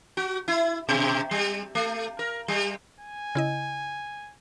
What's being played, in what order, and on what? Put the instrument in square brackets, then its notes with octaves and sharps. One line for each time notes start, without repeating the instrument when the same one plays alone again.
[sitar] F#4
E4
B2
G3
A3
A#4
G3
[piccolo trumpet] G#5
[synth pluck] C#3 E4 D#5